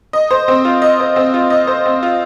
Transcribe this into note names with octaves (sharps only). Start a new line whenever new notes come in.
D#5
C5
C4
F4
D#5
C5
C4
F4
D#5
C5
C4
F4